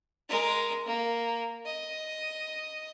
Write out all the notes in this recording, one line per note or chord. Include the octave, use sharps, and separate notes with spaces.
G#3 A#4
A#3
D#5